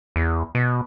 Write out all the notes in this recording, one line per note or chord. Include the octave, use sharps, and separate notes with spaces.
E2
B2